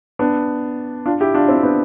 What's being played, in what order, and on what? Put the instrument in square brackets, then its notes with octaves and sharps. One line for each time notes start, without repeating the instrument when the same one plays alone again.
[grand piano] B3 D4
D4 F4
E4 G4
D4 F4
C4 E4
B3 D4